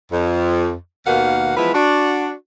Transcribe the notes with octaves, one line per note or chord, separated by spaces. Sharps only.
F2
D#2 B2 D#3 A#3 F5 F#5
E3 F3 G#3 B3 E4 B4
D4 F#4